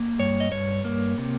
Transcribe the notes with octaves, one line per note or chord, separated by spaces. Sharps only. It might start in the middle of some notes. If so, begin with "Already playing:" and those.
Already playing: A#3
G2 C#5
D#5
G2 C#5
A#3
C3